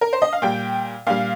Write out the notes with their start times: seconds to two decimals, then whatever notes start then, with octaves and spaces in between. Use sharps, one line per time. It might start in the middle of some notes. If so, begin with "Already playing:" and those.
0.01 A#4
0.13 C5
0.22 D#5
0.33 F5
0.42 A#2 G3 G5
1.07 A#2 G3 F5